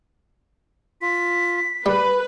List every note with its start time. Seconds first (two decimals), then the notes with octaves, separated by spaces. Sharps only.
1.02 F4 B6
1.86 G3 B4 B5